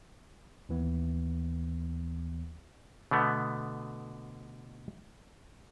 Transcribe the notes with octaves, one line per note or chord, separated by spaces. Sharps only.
D#2 E3 B3
B2 D3 A3 B3